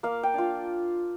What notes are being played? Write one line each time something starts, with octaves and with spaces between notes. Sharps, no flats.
A#3 F5
G5
D4 F4